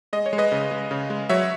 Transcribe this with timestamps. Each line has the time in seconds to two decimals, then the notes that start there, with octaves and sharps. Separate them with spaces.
0.13 G#3 D#5
0.26 C#5
0.33 G#3
0.38 B4 D#5
0.52 C#3
0.71 G#3
0.91 C#3
1.10 G#3
1.29 F#3 C#5 E5